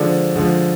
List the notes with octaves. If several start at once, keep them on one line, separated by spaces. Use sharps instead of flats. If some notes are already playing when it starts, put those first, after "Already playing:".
Already playing: D3 F3 G#3 D5
D3 F3 G#3